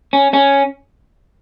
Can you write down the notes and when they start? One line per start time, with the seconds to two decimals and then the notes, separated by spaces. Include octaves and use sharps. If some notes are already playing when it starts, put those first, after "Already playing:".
0.13 C#4
0.33 C#4